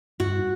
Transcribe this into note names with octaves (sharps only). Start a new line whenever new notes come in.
G2 F#4